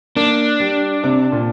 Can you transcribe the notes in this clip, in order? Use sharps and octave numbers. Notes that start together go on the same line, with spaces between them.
A#3 D4
G3
C3
A#2